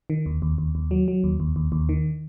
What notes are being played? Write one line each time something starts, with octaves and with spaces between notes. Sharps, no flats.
D#3
D#2
D#2
D#2
D#2
F#3
F#3
D#2
D#2
D#2
D#2
D#3